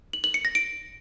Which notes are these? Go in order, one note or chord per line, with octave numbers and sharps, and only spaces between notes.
F#7
F#7
C#7
A#6
D7